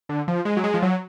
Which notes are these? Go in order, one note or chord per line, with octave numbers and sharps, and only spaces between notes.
D3
F3
G#3
F#3
G#3
F3
F#3